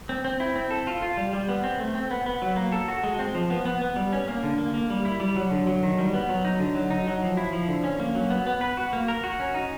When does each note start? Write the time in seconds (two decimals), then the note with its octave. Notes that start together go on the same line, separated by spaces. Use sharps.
0.09 C4
0.25 C4
0.40 E4
0.56 C4
0.71 A4
0.87 F4
1.02 F4
1.17 G3
1.33 G3
1.49 B3
1.63 C4
1.80 A3
1.95 C4
2.11 B3
2.26 B3
2.42 F#3
2.56 A#3
2.72 A4
2.88 F#4
3.04 G#3
3.19 C4
3.35 F3
3.50 B3
3.65 B3
3.82 B3
3.96 G3
4.13 C#4
4.28 A#3
4.43 D3
4.58 A#3
4.74 A#3
4.90 G3
5.05 E4
5.20 G3
5.36 F#3
5.51 D3
5.67 F#3
5.83 D#3
5.98 G3
6.14 B3
6.29 F#3
6.45 D#4
6.59 D3
6.75 F#3
6.90 D#4
7.07 F#3
7.22 F3
7.37 E4
7.52 F3
7.68 D3
7.84 C#4
8.00 A#3
8.15 F#3
8.30 B3
8.46 B3
8.61 B4
8.77 F#4
8.93 A#3
9.08 A#4
9.24 F#4
9.40 C#4
9.54 D#4